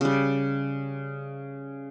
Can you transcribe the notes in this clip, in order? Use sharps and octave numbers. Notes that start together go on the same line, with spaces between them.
C#3 G3